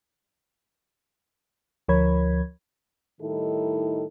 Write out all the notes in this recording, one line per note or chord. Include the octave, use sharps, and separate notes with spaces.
D2 F3 A#4 C#5 B5 G#6
A2 D#3 G3 D#4 E4 A4